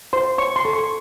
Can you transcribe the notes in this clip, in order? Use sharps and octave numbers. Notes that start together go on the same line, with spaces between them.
C5 C6
C#5 C#6
C6
A4
C#6